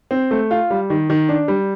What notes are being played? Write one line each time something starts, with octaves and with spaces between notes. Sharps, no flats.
C4
A3
F4
G3
D#3
D#3
D4
G3